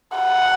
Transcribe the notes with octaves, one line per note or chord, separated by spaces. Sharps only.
F#5